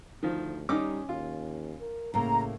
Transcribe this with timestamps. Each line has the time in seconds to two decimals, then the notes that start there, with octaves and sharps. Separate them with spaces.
0.23 D2 D#3 F3
0.69 D#3 G3 C#4 D#4 D6
1.09 D#2 F4
1.81 A#4
2.14 A2 C#3 A#3 A#5